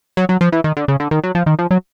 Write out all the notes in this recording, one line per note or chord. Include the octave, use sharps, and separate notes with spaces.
F#3
F#3
F3
E3
D#3
D3
C#3
D3
D#3
F#3
F3
D#3
F3
F#3